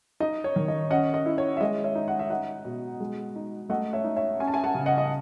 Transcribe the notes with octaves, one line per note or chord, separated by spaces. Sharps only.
D#4 D#5
C#5
D#3
D#5
C#4 D#5 F#5
D#5
E4
C#5
E5
G#3 D#5
C#5 E5
D#4
F#5
E5
D#4 D#5 F#5
B2
G#3
D#4
A3 D#5 F#5
C#5 E5
D#4
C#5 E5
C#4 G#5
A5
E5 G#5
F#5 A5
C#3
D#5 F#5
D#5